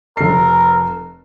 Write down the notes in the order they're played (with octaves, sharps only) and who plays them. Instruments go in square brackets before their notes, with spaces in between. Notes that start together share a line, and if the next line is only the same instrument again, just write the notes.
[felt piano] F1 C7 [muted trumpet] A#4